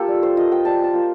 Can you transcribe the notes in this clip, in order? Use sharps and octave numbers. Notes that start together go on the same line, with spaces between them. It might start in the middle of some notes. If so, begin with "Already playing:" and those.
Already playing: A#3 F4 G4 A4
G3
C5
A#3 F4 D#5
G5
G3 A5
A5
A#3 F4